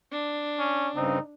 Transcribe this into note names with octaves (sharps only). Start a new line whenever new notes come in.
D4
C#4
G2 C#3 C4 D#4